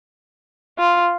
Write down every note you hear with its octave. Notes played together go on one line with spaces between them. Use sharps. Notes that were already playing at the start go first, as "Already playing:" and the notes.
F4